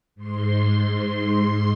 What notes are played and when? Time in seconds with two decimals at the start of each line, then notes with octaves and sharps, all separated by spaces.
0.15 G#2 C6